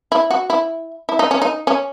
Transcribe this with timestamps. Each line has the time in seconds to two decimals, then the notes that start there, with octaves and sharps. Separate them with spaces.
0.12 E4
0.30 F#4
0.50 E4
1.09 E4
1.19 D#4
1.31 C#4
1.42 D#4
1.67 C#4